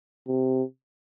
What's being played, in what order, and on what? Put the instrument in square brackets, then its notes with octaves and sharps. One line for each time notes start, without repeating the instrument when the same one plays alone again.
[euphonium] C3